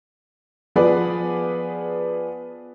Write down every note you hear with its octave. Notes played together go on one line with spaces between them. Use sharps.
F3 B3 G#4 B4 D5